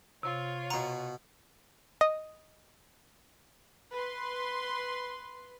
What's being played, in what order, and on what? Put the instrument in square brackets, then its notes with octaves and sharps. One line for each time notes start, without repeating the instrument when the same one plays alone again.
[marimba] C3 [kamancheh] F4 C#5
[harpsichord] B2 F#5 [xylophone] A#5
[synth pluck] D#5
[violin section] B4 C6